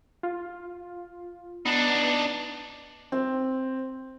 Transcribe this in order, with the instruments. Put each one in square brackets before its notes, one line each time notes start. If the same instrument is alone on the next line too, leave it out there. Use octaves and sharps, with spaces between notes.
[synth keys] F4
[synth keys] B3 [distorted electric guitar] D4 D#4
[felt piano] C4